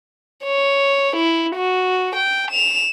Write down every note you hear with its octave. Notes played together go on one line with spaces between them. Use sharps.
C#5
E4
F#4
G5
E7 F7